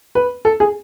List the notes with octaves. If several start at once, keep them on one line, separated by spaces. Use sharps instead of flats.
B4
A4
G#4